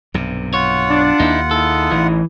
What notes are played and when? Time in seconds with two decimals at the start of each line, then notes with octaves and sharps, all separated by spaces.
0.14 B1 G2 C3
0.54 F4 C#5 F#5
0.90 D4
1.20 D#2 A#3 D#4 E4
1.51 D#4 E4 G#4 A4
1.91 A1 E3